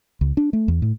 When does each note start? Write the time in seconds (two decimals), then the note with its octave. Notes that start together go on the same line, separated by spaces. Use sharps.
0.21 C#2
0.37 D4
0.53 A3
0.68 E2
0.82 A2